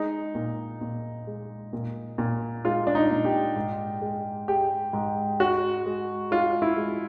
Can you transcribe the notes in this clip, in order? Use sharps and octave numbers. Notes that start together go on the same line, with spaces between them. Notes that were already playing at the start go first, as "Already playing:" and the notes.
Already playing: G#3 D#4
A#2
A#2
G#3
A#2
A#2
G#3 F4
D4
D#4
A#2
G4
G#2
G#3
G#3 G4
G#2
G#3 F#4
G#3
G#3 F4
E4
G#3